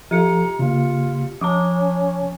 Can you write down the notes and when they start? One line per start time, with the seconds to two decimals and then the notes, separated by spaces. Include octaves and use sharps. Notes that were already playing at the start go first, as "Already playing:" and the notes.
0.11 F3 F4 G4 A4 A#5 C#7
0.59 C#3 A#3 F4
1.41 F3 C#4 A5 A#5 D6 D#6